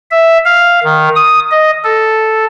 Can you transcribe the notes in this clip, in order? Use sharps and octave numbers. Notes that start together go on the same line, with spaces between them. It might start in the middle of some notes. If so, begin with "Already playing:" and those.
E5
F5
D#3
D#6
D#5
A4